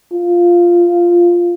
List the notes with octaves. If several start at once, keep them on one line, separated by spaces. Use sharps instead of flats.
F4